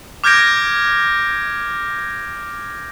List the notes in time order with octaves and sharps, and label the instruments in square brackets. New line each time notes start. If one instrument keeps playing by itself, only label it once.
[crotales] D6 F6 G6 G#6 A#6 D7